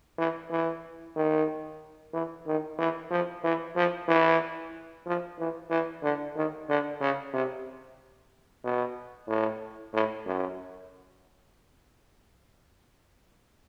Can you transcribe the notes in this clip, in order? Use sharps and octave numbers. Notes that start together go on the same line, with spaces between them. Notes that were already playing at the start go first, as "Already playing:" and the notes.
E3
E3
D#3
E3
D#3
E3
F3
E3
F3
E3
F3
E3
E3
D3
D#3
D3
C#3
C3
B2
A2
A2
F#2